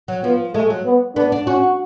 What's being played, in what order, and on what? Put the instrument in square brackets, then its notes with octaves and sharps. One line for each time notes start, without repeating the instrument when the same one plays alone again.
[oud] F#3
[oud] F3 [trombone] B3
[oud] G#3 [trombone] A3
[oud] F#3
[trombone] B3
[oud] B3 [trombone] D4
[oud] D4
[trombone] C#4 [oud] F#4